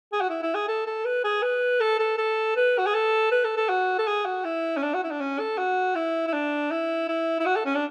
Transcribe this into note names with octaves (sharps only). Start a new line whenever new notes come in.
G#4
F#4
E4
E4
G#4
A4
A4
B4
G#4
B4
A4
A4
A4
B4
F#4
G#4
A4
B4
A4
A4
F#4
A4
G#4
F#4
E4
C#4
D4
F#4
E4
D4
C#4
A4
F#4
E4
E4
D4
E4
E4
E4
F#4
A4
C#4
D4